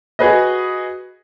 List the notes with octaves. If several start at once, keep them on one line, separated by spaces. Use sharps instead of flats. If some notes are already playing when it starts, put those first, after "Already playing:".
F#4 G#4 B4 D#5